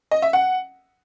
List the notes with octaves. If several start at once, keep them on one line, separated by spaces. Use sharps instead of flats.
D#5
E5
F#5